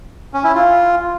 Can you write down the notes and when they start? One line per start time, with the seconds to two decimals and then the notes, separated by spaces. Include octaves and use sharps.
0.34 C#4
0.44 E4
0.54 F4